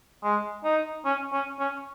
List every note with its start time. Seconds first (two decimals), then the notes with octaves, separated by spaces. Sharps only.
0.23 G#3
0.64 D#4
1.05 C#4
1.32 C#4
1.59 C#4